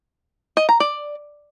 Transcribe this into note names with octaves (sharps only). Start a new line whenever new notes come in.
D#5
A#5
D5